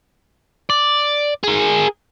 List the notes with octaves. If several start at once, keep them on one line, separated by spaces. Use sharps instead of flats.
D5
G#4 A#4